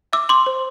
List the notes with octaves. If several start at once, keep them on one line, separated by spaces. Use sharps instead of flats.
E5 D6 E6
C6 D6
C5